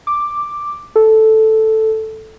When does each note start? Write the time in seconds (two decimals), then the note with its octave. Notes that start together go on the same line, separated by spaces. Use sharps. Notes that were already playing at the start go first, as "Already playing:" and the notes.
0.07 D6
0.96 A4